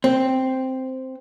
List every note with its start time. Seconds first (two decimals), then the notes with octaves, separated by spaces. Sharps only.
0.04 C4